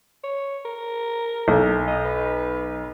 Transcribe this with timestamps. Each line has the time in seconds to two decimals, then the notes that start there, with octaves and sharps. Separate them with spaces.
0.24 C#5
0.65 A#4
1.48 B1
1.87 D#5
2.05 B4